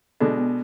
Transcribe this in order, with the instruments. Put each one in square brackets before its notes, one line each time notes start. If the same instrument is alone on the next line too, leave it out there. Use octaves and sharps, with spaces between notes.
[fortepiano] B2 G#3 D4 [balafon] A4
[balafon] B3